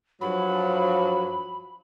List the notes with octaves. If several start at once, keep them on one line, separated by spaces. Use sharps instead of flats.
G2 F3 F#3 B5